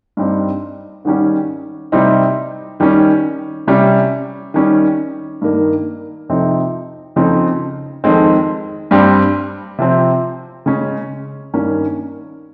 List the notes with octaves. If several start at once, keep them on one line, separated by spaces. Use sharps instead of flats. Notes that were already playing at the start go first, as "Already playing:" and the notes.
G2 G3 C4 D#4
G#2 D#3 G3 C#4
C3 G3 C4 D#4
D#3 G3 C#4
C3 G3 C#4
D#3 G3 C#4
G2 D#3 A#3 D#4
F2 C3 F3 C4 D#4
F2 C#3 F3 C4 D#4
F2 D#3 G#3 C4
G2 G3 C4
C3 F3 C4
C#3 G#3 C#4
G2 D#3 A#3 C#4